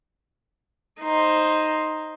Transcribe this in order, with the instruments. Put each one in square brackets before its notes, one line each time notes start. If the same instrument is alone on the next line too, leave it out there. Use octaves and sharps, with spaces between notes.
[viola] D#4 C5